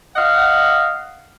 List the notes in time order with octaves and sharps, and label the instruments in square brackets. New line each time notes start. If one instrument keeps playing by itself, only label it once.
[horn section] D#5 F5 F#5